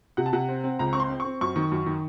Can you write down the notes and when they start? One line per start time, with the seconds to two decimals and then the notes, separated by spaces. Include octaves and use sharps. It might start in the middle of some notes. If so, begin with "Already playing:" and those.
0.17 C3 F#5
0.26 A5
0.33 C3 F#5
0.49 C4
0.64 C4
0.79 C#2 A#5
0.93 C4 C#6
1.00 C6
1.10 C4
1.20 C#6
1.25 C4
1.41 F#2 C#6
1.56 D#3
1.72 F#2
1.86 D#3